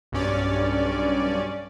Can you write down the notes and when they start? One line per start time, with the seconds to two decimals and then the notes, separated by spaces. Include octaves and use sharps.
0.12 B1 G2 C#4 D5